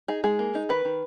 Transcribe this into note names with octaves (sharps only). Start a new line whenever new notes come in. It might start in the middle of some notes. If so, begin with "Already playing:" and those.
D#4 G#4
G#3 G#4
A#3
D#4
D#3 B4
D#3